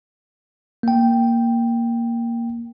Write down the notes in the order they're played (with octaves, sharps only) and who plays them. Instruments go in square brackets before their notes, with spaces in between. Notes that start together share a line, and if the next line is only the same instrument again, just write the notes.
[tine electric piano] A#3 G5